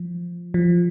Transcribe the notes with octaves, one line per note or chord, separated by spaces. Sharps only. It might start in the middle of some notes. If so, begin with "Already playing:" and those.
Already playing: F3
F3